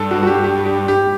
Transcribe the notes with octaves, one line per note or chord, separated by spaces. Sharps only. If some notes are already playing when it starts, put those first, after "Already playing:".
Already playing: G2 A4
F#4
F#4
G4
G4
G4
G4